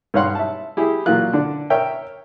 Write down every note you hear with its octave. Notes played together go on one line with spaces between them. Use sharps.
G2 D#4 C#5 F5 F#5 C6
E5 A5
E4 G4 G#4
A#2 E3 F#3 A#3 F4 F#6
D3 D4
A#4 C#5 E5 G5